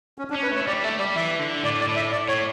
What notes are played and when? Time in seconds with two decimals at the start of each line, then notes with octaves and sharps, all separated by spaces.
0.18 C#4
0.30 D4
0.34 C#4
0.43 B4
0.51 A3 C#5
0.67 G3 D5
0.84 A3 E5
0.99 G3 D5
1.16 E3 E5
1.39 D3
1.64 A2 D5
1.81 D5
1.88 A2
1.96 E5
2.12 D5
2.28 A2 C#5